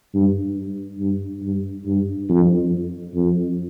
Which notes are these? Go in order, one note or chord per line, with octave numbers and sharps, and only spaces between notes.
G2
G2
G2
G2
F2
F2